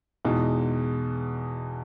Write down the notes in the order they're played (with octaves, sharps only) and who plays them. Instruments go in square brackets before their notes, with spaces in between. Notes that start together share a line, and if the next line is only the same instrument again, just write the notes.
[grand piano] E2 B2 G#3 D#4